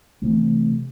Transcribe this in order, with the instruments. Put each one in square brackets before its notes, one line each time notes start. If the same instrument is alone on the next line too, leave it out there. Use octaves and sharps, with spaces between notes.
[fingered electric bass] C3 E3 A3 C4